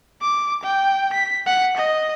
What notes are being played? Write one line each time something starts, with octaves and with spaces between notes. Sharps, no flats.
D6
G5
B6
F#5
D#5